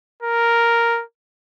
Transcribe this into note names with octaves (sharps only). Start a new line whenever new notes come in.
A#4